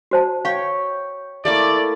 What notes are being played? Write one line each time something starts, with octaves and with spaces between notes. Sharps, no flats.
F#4 C5 A5
C#5 F5 G5
A3 A#3 E4 D5